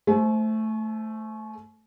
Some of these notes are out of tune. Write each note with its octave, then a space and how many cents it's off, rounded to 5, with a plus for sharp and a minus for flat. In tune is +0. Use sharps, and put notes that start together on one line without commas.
A3 +0 C5 +0 G#5 +45